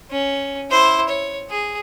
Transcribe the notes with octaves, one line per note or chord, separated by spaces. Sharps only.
C#4
E4 C5
C#5
G#4